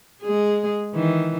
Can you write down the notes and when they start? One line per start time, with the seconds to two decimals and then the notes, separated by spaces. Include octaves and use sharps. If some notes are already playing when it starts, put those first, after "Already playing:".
0.22 G#3 G#4
0.94 D#3 E3